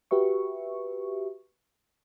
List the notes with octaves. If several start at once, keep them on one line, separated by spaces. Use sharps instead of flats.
F#4 G4 B4 E5 C#6